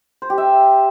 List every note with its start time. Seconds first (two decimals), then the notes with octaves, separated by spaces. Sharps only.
0.22 C5
0.30 G4
0.38 E5